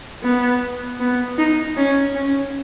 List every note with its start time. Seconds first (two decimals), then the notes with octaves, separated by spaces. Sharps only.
0.23 B3
1.00 B3
1.38 D#4
1.77 C#4
2.15 C#4